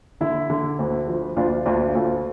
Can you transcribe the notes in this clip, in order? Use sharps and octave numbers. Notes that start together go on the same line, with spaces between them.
D3 E4
D3
D2
F3
D2 D4 F4
D2 D4 F4
D2 F4 A4